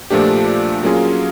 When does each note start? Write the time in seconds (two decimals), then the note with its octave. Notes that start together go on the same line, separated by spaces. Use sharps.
0.10 A#2 F3 A3 D4 G4
0.83 F#3 A#3 C#4 F4 G#4